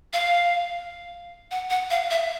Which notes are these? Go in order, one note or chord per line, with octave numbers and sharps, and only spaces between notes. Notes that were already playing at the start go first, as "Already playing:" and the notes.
F5
F#5
F#5
F5
E5